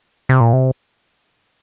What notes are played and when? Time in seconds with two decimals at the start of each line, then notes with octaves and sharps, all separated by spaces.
0.29 C3
0.41 A#2
0.53 C3